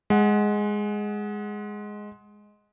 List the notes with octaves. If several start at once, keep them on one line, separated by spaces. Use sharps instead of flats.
G#3 F#5